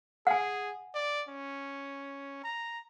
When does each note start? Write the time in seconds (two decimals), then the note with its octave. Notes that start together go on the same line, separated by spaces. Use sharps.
0.27 G#4 F#5 G#5
0.94 D5
1.29 C#4
2.44 A#5